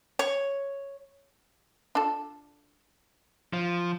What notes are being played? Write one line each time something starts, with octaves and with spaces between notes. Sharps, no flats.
C#5
D4 F4 A4
F3